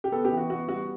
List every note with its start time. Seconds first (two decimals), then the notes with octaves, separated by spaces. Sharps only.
0.04 G4
0.12 B3 A4
0.25 G4
0.31 E3
0.37 F#4
0.50 B3 F#4
0.68 G3 F#4